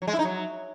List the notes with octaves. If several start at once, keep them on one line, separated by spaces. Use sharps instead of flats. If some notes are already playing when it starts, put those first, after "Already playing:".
F#3
G#3
E4
D#4
F#3